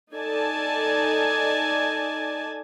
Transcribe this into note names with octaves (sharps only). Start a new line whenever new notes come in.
D#4 A4 D5 G#5 A5